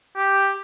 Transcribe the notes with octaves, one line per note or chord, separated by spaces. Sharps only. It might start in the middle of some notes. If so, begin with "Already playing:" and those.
G4